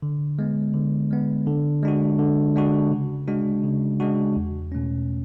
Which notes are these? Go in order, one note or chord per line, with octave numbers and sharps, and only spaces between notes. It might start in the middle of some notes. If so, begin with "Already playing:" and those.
D3
G#3 B3
D3
G#3 B3
D3
G#3 D4 F#4
D3
G#3 D4 F#4
C#3
G#3 D4 F#4
C#3
G#3 D4 F#4
E2
B2 A3 C#4